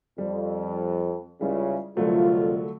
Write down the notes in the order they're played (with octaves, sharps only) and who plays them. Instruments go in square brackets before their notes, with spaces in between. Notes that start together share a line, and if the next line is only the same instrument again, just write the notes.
[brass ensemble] F2 [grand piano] G3
[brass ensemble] C#2 C#3 [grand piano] G3 E4 F4
[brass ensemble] C2 F2 F4 [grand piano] D3 F#3 A3